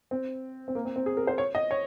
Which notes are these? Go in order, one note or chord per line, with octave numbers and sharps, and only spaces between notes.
C4
C4
A#3
C4
C4
G#4
A#4
C5
C#5
D#5
C#5